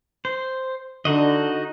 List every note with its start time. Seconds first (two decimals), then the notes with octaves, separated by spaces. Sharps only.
0.25 C5
1.05 D3 D#4 F#4 D#5